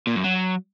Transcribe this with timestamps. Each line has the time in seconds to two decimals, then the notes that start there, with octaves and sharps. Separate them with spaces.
0.07 A#2
0.15 F#2
0.24 F#3